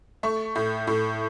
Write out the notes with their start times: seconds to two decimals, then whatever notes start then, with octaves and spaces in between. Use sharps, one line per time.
0.23 A3 C#6
0.55 A2
0.87 A2